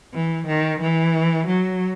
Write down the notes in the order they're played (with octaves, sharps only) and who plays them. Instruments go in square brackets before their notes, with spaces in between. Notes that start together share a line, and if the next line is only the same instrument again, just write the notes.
[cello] E3
D#3
E3
F#3